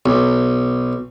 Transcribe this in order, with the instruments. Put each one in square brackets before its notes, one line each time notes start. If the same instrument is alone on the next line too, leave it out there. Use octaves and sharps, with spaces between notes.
[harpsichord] B1